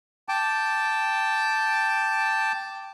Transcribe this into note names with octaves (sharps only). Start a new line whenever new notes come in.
G5 A5 D6